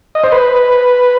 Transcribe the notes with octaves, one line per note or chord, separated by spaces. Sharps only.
D#5
C5
B4